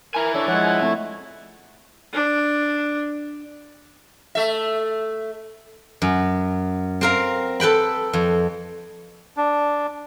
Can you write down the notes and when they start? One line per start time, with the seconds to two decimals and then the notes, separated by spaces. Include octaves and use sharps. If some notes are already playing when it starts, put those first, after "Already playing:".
0.15 E4 A#4 G#5
0.35 D4 A4 C#5 D5
0.48 F3 G#3 C#5 E5 F#5
0.82 A3 C4
2.13 D4
4.35 A3 E5
6.02 F#2
7.01 C4 A#4 F5
7.60 A4 B4 G5 B5
8.13 F2
9.37 D4